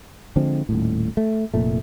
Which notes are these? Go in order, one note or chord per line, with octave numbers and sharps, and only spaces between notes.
D3 F3 G#3 C4
D#1 A2
A3
F1 A#2 A3